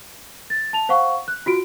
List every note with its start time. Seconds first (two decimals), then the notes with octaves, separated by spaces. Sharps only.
0.50 A6
0.73 A5 F7
0.89 C5 F5 F#5 C#6
1.28 F#6
1.46 F4 F#4 D7